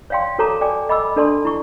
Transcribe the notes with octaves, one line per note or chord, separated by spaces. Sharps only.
C#5 D5 F5 G5 C6
F#4 A4 C#5 A5 A#5 D6
D5 G5 G#5 D6
D#5 B5 D6 E6
D4 A4 D5 A5 C6
E4 C#6